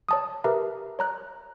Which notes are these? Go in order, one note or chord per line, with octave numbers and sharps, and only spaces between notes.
C#5 A5 D#6
G4 A#4 B4 E5 A#5
C#5 A#5 F#6